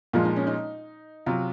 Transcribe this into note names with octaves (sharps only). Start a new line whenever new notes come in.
A#2 F3 G#3 F4
D#4
C#4
D#4
C3 F#3 F4